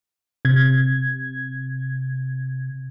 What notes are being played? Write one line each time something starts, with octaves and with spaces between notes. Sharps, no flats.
C3 G#6